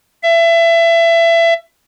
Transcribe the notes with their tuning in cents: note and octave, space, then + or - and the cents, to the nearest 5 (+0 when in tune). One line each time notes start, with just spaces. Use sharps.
E5 +25